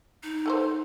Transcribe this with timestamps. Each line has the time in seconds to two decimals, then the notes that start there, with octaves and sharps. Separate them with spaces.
0.23 D#4
0.46 A3 A4 C5